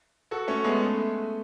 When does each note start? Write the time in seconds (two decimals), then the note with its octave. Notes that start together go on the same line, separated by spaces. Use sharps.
0.31 F#4 A4
0.48 A3 C#4
0.64 G#3 B3
0.81 A3